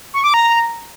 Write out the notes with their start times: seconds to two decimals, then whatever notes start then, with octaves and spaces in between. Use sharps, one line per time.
0.14 C#6
0.24 D6
0.34 A#5